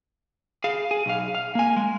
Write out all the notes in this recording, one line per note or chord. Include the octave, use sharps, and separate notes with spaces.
G#4 F5
G#4
B1 F5
F5
A#3 G#5
G#3